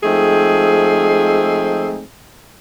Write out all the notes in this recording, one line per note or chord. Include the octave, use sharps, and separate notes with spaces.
F3 G#3 A3 C4 D#4 G#4